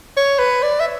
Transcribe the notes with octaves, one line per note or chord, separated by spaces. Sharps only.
C#5
B4
D5
E5